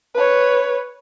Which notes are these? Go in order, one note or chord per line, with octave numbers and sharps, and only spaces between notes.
B4 C#5